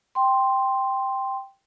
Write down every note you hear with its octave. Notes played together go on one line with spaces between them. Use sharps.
G5 C6